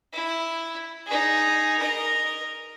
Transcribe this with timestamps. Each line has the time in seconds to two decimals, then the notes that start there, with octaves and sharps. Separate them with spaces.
0.13 E4
1.06 D#4 G#4
1.78 A#4 D#5